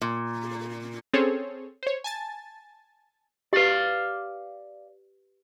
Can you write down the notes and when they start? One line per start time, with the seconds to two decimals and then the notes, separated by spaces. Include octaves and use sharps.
0.01 A#2
1.13 C4 C#4 G#4 A4 C5 C#5
1.83 C5 C#5
2.04 G#5 A5 A6
3.53 G4 B4 D5 F5